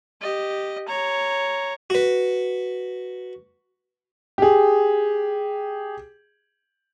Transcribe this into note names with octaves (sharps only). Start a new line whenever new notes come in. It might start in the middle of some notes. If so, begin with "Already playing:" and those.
G4 D#5
C#5 A#5
F#4 B4
G4 G#4